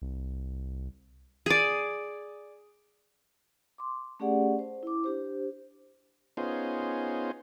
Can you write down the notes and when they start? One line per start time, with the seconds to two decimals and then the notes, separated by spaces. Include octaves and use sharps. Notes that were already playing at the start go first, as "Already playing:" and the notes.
0.02 C2
1.46 G#4 D5
3.78 C6 D6
4.20 A3 C#4 G4 G#4 D5 F#5
4.59 C5
4.83 E4 D6
5.04 D4 G4 C5
6.37 B3 C#4 D#4 F4 G#4 C5